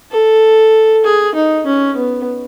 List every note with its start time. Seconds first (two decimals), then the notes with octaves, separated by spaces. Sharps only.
0.11 A4
1.04 G#4
1.35 D#4
1.66 C#4
1.96 B3